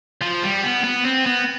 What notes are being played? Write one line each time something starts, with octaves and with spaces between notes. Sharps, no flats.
F3
G3
B3
B3
C4
B3